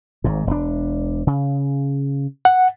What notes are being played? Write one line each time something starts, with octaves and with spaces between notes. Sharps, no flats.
G#1 G#2
E1 D4
C#3
F#5